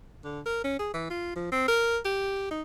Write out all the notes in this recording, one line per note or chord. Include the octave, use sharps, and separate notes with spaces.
D3
A#4
C#4
G#4
E3
F4
F3
C4
A#4
G4
D#4